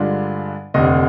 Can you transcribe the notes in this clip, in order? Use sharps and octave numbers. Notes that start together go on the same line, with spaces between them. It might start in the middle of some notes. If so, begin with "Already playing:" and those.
Already playing: G2 D3 G#3 D4 F4
F1 D#2 D3 D#5